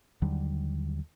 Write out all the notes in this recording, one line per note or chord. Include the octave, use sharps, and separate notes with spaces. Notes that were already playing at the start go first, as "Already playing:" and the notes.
D#2 D3 F#3 G3